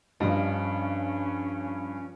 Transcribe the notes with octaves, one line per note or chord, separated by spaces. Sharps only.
G2 F3 C#4 D#5